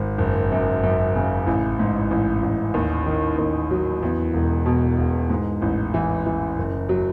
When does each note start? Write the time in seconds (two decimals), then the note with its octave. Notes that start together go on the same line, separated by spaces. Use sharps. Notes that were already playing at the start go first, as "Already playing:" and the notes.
Already playing: G#1
0.18 F#1
0.51 F#2
0.83 F#2
1.15 C#3
1.47 A1
1.79 G#2
2.11 A1
2.42 A1
2.74 D#2
3.06 D#3
3.38 D#2
3.71 F#3
4.02 E2
4.33 E1
4.66 B2
4.98 E1
5.30 G#2
5.62 A1
5.94 E3
6.26 E3
6.57 F#1
6.89 F#3